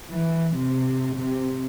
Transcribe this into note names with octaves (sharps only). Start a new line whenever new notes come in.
E3
C3
C3